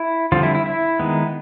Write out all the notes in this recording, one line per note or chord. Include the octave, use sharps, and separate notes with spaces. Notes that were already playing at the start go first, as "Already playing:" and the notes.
Already playing: E4
D3 F3 G3 C4 F4
E4
E4
E4
D#3 G#3 B3